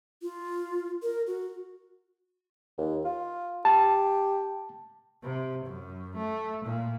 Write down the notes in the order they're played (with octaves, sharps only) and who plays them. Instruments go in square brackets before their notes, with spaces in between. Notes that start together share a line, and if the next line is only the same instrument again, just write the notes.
[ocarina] F4
A#4
F#4
[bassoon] D#2
F4
[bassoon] G4 [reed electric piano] A5
[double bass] C3
F#2
A3
A#2